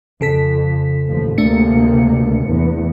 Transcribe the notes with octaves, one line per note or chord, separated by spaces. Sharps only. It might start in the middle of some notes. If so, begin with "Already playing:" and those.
F2 C#3 A4 B6
A1 D#2 F3
D2 C3 A3 A#3 D4 C#7
E2